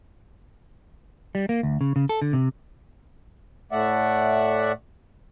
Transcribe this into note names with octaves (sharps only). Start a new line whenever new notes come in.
G3
A#3
D2
C#3
C#3
A4
D3
C3
A2 A3 D5 E5 F#5